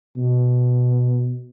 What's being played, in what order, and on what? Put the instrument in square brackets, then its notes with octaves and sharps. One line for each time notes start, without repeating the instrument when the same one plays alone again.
[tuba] B2